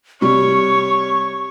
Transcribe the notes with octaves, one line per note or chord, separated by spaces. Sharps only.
C3 G3 C#5 C#6